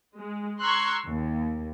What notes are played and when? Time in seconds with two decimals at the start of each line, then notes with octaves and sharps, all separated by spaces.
0.18 G#3
0.61 A#5 C6 C#6 E6 F#6 G#6
1.08 D#2